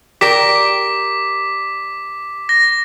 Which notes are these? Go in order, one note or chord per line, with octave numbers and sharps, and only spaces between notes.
G4 A#4 D5 D6 B6
A#6